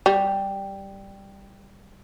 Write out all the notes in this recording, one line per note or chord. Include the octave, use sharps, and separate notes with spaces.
G3